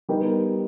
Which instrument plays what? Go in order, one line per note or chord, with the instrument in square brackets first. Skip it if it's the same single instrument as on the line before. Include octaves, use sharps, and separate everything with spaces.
[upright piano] G3 B3 D#4 G4 A#4